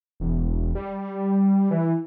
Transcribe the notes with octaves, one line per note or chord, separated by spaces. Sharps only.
E1
G3
E3